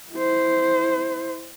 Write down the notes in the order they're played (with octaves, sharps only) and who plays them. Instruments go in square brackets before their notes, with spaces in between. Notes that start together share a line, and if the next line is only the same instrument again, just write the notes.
[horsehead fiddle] E4 C5